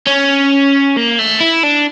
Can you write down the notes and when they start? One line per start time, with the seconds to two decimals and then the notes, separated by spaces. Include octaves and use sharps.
0.07 C#4
0.97 A#3
1.19 A3
1.40 E4
1.63 D4